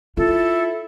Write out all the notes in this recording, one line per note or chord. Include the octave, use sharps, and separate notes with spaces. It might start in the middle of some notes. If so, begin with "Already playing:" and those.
E4 F4 A4